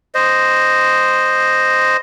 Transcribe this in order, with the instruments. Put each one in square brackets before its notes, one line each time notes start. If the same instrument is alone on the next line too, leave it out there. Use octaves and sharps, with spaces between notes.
[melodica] C5 D#5